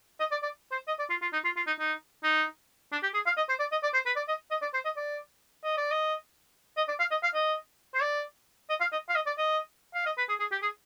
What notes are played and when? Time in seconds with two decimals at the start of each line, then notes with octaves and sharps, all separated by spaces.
0.20 D#5
0.31 D5
0.43 D5
0.72 C5
0.88 D#5
0.99 D5
1.10 F4
1.22 F4
1.33 D#4
1.45 F4
1.57 F4
1.67 D#4
1.79 D#4
2.23 D#4
2.92 D4
3.03 G4
3.14 G#4
3.26 F5
3.37 D#5
3.49 C5
3.60 D5
3.72 D#5
3.83 D5
3.94 C5
4.06 B4
4.16 D5
4.28 D#5
4.51 D#5
4.62 D5
4.74 C5
4.85 D#5
4.97 D5
5.64 D#5
5.77 D5
5.91 D#5
6.77 D#5
6.89 D5
7.00 F5
7.11 D#5
7.23 F5
7.34 D#5
7.94 C5
8.02 D5
8.70 D#5
8.81 F5
8.92 D#5
9.09 F5
9.15 D#5
9.26 D5
9.38 D#5
9.95 F5
10.06 D#5
10.18 B4
10.29 G#4
10.40 G#4
10.52 G4
10.62 G#4